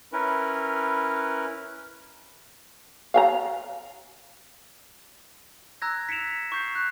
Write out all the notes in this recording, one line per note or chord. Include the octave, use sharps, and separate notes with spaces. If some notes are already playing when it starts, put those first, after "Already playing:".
C#4 E4 A#4 B4
F5 G5 A#5
A#5 E6 F#6 G#6 A#6
B6 C#7 D7 E7 F7
C#6 G6 C7
F#6